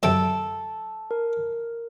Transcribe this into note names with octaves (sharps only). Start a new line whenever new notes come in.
F#2 C3 A4 G5
A#4